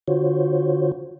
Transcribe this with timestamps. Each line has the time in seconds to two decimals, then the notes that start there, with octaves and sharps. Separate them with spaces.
0.08 D3 F4 F#4 C5 C#5